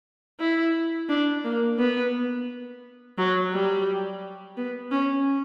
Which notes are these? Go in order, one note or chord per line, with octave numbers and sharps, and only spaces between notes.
E4
D4
A#3
B3
F#3
G3
B3
C#4